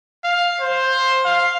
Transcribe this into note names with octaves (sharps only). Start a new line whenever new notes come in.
F5
C5
F5